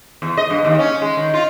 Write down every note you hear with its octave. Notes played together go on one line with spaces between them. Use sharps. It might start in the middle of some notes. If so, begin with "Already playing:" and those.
E2
D#5
G2
D#2
C#4
G#3
D#3
F4